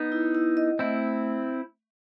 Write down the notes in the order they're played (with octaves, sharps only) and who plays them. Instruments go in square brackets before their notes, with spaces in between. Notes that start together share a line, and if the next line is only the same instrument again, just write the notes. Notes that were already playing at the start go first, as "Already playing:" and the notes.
Already playing: [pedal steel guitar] B3 D#4
[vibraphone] E4
E4
D#5
[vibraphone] A3 [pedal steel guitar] C4 E4